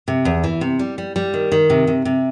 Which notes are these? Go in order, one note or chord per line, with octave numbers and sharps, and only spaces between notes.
C3
E2
E3
C3
G3
G3
G3
D#3
D#3
C3
C3
C3